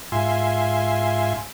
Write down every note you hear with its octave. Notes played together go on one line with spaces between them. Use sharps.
G#2 F4 E5 G#5 C6